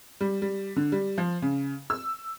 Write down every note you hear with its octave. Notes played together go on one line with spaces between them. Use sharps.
G3
G3
D3
G3
F3
C#3
E6